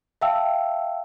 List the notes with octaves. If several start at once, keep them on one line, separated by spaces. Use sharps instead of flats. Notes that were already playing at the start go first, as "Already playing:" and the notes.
E5 F5 G5 A5 E6